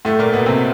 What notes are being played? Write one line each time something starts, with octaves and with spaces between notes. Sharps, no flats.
A2 A3
A#2 A#3
B2 B3
C3 C4